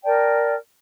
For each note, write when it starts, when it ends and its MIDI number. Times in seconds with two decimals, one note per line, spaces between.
0.03 0.54 70
0.03 0.54 74
0.03 0.54 79
0.03 0.54 81